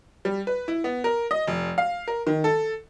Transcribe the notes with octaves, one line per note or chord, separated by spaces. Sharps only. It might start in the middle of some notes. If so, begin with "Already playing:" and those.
G3
B4
E4
B3
A#4
D#5
F1
F5
A#4
D#3
A4